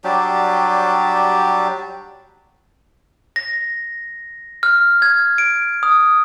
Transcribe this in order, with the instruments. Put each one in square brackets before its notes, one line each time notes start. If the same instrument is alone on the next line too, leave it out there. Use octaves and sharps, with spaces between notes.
[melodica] F#3 G3 D4 G4
[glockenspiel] A#6
F6
G#6
D7
D#6